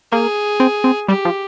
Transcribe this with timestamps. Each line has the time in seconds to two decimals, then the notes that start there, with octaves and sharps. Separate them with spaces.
0.12 A#3 G#4
0.60 C4
0.84 C4
1.08 G3 G4
1.25 F3